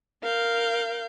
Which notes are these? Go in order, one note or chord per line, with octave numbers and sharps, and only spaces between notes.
A#4 F5 G6